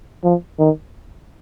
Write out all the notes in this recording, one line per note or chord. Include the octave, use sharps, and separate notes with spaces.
F3
D#3